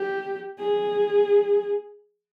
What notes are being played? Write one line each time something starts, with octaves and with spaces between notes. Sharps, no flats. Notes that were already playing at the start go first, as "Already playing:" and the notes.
Already playing: G4
G#4